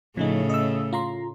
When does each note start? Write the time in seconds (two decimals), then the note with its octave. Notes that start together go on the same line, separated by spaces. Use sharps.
0.17 A2 C#3 F3 A3 C#4 D#4
0.49 D#5 E6
0.93 F4 A#5 C6